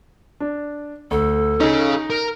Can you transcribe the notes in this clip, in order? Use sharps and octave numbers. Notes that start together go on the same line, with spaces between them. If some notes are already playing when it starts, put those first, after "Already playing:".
D4
D2 A4
C#4 D#4 G#4
A#4